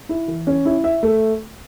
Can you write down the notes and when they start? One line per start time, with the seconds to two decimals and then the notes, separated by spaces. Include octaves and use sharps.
0.09 E4
0.28 E3
0.47 C#4
0.65 E4
0.84 E5
1.03 A3